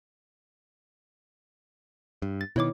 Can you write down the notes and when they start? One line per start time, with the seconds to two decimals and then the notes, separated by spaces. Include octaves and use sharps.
2.22 G2
2.41 A6
2.56 B2 D#3 E4 C#5 D6